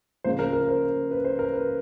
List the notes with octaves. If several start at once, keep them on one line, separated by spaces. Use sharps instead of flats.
C#3 F3 A#3 C5
A#4
A#4
C5
B4
C5
A#4
B4